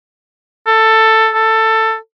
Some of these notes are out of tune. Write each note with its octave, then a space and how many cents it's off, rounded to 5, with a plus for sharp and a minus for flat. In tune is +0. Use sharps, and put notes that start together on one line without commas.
A4 +10
A4 +15